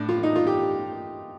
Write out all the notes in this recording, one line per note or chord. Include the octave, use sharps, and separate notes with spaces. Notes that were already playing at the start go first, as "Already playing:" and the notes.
Already playing: A2 D4
F4
D#4
F4
G4